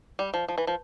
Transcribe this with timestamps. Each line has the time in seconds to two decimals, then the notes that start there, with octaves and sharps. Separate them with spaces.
0.19 G3
0.34 F3
0.48 F3
0.58 E3
0.67 F3